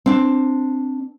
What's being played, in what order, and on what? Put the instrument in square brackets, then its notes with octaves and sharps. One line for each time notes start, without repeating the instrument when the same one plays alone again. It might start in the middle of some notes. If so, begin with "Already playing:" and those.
[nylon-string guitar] C4 D4